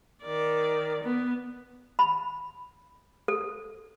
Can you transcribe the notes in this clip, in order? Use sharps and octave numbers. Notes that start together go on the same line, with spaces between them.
D#3 D5
B3
B5
A4